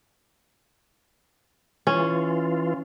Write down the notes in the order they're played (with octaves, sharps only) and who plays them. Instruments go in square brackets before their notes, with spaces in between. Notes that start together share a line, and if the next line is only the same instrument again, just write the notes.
[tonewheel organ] E3 F4 [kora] C#4